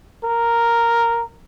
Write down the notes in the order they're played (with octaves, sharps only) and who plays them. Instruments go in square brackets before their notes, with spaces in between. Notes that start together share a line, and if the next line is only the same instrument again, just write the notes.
[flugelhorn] A#4